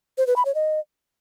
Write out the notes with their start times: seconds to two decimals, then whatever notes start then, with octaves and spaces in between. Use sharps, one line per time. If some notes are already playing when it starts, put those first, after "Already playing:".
0.18 C5
0.27 B4
0.36 B5
0.45 C#5
0.55 D#5